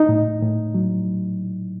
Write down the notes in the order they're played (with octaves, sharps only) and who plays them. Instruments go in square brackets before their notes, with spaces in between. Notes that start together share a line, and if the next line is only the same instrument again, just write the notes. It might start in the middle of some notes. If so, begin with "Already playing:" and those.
Already playing: [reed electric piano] D#4
A2
A2
F#3